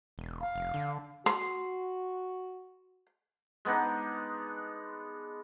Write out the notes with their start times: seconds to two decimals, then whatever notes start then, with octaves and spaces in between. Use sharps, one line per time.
0.18 E1
0.41 F5
0.56 F1
0.74 D3
1.26 F#4 C6
3.65 G#3 B3 D4 D#4